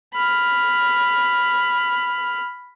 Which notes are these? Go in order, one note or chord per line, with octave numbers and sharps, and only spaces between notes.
B5 F6